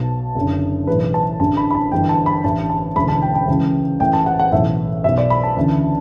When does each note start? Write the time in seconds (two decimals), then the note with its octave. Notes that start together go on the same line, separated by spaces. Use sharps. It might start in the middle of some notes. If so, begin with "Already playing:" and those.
Already playing: B1 B2 A5
0.35 F#1 F#2 D3
0.87 B1 A2 E3 B4
1.00 B4
1.14 A5
1.40 A1 G2 D3 A5
1.57 B5
1.71 B5
1.75 A5
1.92 G1 G2 E3 G5
2.09 A5
2.26 B5
2.44 A1 G2 E3 A5
2.70 A5
2.96 E1 D2 C#3 E3 B5
3.08 A5
3.22 G5
3.35 G5
3.48 C#2 C#3 E3
4.00 A1 A2 E3 G5
4.13 A5
4.26 F#5
4.39 F#5
4.52 B1 A2 E3 E5
5.04 B2 E5
5.08 B1
5.18 D5
5.30 B5
5.43 A5
5.57 D2 C#3 E3